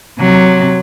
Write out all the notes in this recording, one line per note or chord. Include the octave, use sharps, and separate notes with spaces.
C3 F#3